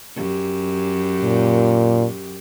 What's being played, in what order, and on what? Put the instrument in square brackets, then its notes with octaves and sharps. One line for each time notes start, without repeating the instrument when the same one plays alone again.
[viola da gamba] F#2 G4
[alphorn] A#2